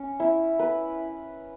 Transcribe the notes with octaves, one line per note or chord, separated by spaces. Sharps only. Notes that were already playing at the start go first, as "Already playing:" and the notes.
Already playing: C#4
E4
B4